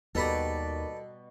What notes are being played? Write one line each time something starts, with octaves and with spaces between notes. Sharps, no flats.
D#2 B2 G3 A4 B4 D5 A#5